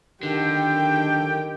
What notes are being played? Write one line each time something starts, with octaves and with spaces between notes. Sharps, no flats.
D3 D#3 G4 G5